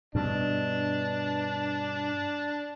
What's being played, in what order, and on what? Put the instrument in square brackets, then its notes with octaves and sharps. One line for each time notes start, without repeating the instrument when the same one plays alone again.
[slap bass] G2 B2 [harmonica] D4